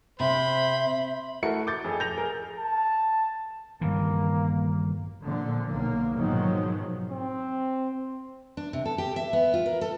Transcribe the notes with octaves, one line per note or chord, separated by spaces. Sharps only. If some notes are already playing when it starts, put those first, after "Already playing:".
C3 C5 E5 B5
A3 E4 F#4 A#4 C#7
D6 G6 A6
F2 G#4
G6 A#6 F7
G#4 A#4
A5
G2 D#3 E3 A#3
A#2 D3 F3
B1 A#3
G#2 B2 D#3 F3 F#3
C4
D4
C3
A4
G4
E5
B3
F4
A#4
A4